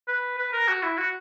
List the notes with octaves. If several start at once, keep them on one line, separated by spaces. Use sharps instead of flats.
B4
B4
A#4
F#4
E4
F#4